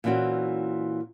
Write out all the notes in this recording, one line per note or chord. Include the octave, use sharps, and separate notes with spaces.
A#2 E3 C4 C#4 F#4